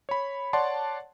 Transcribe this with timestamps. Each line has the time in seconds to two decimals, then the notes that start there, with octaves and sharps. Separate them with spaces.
0.09 C#5 B5
0.53 C#5 D5 F#5 A5 C6